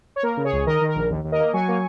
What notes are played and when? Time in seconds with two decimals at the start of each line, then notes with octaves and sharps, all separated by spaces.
0.16 C#5
0.23 A#3 A#4
0.37 C#3
0.44 G#4 C#5
0.52 C#2
0.66 D#3 A#4 D#5
0.81 D#3
0.88 A#4
0.95 A#1
1.10 D#2
1.24 D#2
1.32 A#4 D#5
1.39 A#3
1.53 F#3 G#5 C#6
1.68 A#3